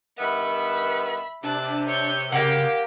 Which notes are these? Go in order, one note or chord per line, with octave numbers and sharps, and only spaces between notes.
G2 D#3 B3 E5 B5
C3 D4 A5 F#6
C#5 G6
C#3 A#3 G4 F#5